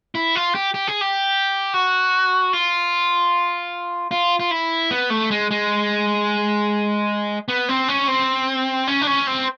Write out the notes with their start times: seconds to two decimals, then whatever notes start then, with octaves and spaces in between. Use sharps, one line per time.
0.15 E4
0.35 F4
0.55 G4
0.74 G4
0.88 G#4
1.01 G4
1.74 F#4
2.53 F4
4.11 F4
4.40 F4
4.51 E4
4.91 B3
5.10 A3
5.31 G#3
5.51 G#3
7.48 B3
7.69 C4
7.88 C#4
8.08 C4
8.88 C#4
9.02 D4
9.07 C#4
9.27 C4